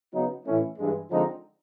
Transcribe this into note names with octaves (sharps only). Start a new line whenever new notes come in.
C#3 F#3 B3 D#4
A2 E3 A3 C#4 E4
G2 E3 G#3
D3 F3 G#3 C4 D#4